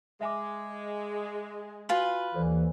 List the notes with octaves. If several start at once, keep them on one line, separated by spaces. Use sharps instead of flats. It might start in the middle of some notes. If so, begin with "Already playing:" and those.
G#3 E5 G#5 D6
F4 F#4 B4 G#5 F#7
D#2 E3 A4 C5 D5